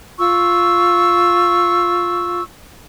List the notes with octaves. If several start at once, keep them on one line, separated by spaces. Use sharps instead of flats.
F4 C#6 E6